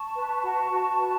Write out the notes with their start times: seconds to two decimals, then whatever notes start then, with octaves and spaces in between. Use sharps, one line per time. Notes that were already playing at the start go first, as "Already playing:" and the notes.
Already playing: A5 C#6
0.15 B4
0.43 F#4
0.71 F#4
0.99 B4